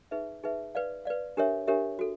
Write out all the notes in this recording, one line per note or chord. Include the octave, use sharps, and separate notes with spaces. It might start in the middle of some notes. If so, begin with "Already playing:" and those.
D#4 G#4 B4 E5
D#4 G#4 B4 E5
B4 D5 F5
B4 D5 F5
D4 G4 A#4 C#5 E5
D4 G4 A#4 C#5 E5
F#4 A4